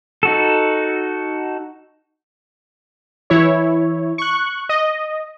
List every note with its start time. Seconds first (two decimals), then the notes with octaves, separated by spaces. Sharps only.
0.23 D#4 F#4 A4
3.30 E3 E4 C#5
4.18 C#6 F#6
4.69 D#5